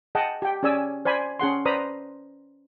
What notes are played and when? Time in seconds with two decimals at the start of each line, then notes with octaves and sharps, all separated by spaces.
0.15 G#4 D#5 F#5 G5 A5
0.42 G4 G5
0.63 C#4 G#4 D5 G#5 E6
1.05 C5 D5 G#5 B5
1.39 C#4 G#4 F#5 C6
1.65 B4 C5 D5 A#5 B5 D#6